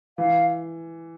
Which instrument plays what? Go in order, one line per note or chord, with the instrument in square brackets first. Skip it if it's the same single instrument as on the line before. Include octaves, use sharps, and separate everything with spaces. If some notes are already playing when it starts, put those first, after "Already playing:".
[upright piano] E3 [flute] F5